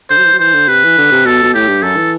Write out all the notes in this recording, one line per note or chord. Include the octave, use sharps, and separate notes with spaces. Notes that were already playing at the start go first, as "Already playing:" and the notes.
D3 C5
F#3
E3
F#3
E3 C5
D3
C3 B4
E3
D3
C3
B2 A4
B2
A2 G4
G2
F#2 A4
E3